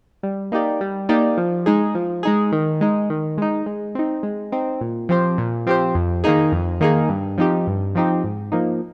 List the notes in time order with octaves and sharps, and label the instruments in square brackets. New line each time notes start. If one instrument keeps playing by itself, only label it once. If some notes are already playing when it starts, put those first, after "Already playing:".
[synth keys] G3
A#3 D#4 G4 D5
G3
A#3 D#4 G4 D5
F3
G#3 D#4 G#4
F3
G#3 D#4 G#4
D#3
G#3 D#4
D#3
G#3 D#4
G#3
C4 D#4
G#3
C4 D#4
A#2
F3 C4 G4 C5
A#2
F3 C4 G4 C5
F2
D#3 A#3 D#4 G#4
F2
D#3 A#3 D#4 G#4
G2
F3 C4 D#4 G4
G2
F3 C4 D#4 G4
G#2
F3 A#3 D#4